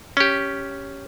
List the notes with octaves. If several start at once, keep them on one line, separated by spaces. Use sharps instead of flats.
C#4 G4